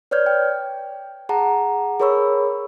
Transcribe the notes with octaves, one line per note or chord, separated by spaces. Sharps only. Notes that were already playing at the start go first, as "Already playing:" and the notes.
B4 C#5 D5 F6 G6 G#6
G5
G#4 F#5 A5 A#5
G#4 A#4 C#5 B5 C#6 E6